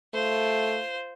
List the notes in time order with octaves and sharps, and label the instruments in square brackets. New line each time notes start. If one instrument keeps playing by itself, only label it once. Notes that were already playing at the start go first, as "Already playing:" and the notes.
[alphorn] A3 [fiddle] F4 C5